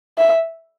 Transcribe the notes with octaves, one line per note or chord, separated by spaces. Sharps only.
E5